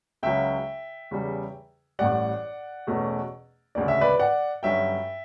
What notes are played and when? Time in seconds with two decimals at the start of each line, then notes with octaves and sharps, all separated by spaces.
0.23 C#2 C#3 F#3 C#4 E5 G5
1.11 E2 C#3 G3
1.99 A1 A2 G3 D5 F#5
2.87 E2 B2 A3 C#4
3.75 E1 D2 C#3 D5
3.88 E5
4.01 B4 D5
4.19 D5 F#5
4.63 G1 G2 F#3 C#4 E5 G5